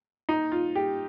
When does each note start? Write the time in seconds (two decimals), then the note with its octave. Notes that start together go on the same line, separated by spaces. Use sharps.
0.29 D#4
0.52 F4
0.75 G4